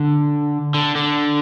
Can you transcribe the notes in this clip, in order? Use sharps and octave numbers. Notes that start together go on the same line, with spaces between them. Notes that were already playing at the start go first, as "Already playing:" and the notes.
Already playing: D3
D3
D3